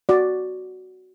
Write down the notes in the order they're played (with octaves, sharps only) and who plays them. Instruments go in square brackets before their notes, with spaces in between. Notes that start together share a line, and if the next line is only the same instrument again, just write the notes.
[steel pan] F#4 D5